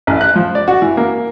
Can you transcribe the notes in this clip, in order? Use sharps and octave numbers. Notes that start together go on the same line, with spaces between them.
A1
F#6
F3
D5
F#4
E3
A#3